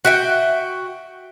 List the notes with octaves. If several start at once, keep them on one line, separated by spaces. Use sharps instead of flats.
F#4 E5 G5